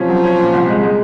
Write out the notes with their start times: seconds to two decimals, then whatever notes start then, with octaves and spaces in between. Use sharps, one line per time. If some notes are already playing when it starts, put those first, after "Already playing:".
Already playing: C3 F3 C#4
0.09 F#3
0.24 C#4
0.39 A#2
0.53 C2
0.68 G#3
0.83 G#3